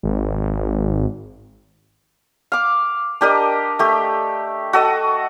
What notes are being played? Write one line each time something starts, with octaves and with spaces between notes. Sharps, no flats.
G#1
F5 D6
D4 G4 A#4 D#5
A3 G4
F#4 A4 D#5